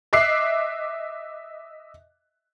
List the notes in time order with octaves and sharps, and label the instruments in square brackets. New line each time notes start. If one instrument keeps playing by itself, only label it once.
[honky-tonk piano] D#5 E5 D6 F#6 C7